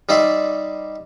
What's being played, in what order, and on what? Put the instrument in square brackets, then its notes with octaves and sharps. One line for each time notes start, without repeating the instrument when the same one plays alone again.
[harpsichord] G3 D#4 D5 E5 C6